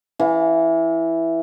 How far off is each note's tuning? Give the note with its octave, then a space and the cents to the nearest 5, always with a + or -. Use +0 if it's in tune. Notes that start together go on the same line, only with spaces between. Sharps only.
E3 +0 F5 +35